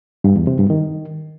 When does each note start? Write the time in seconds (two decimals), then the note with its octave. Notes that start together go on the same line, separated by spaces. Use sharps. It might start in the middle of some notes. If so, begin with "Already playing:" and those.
0.24 G2
0.36 E2
0.47 C3
0.59 G2
0.70 D#3